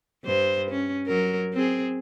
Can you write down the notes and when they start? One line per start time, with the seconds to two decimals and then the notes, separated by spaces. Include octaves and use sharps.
0.24 G2 C5
0.71 C#4
1.07 F#3 A#4
1.53 C4 G#4